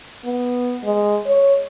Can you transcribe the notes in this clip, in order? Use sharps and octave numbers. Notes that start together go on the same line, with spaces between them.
B3
G#3
C#5